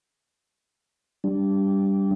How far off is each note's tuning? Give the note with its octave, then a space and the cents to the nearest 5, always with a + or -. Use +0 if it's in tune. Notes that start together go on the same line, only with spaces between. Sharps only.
G3 +0 D4 -20